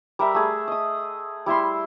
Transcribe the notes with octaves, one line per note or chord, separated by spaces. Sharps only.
G3 A#4 E5 B5
A3 G#4
D#5 D#6
G3 E4 E5 C6